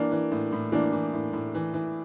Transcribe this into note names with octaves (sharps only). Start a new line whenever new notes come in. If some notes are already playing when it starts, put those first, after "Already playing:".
Already playing: E3 A#3 D4
E3
A2
A2
E3 A#3 D4
E3
A2
A2
E3
E3